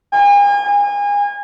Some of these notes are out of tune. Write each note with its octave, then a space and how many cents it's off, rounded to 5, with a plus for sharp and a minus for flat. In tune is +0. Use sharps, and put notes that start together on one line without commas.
G#5 -40
G#5 -30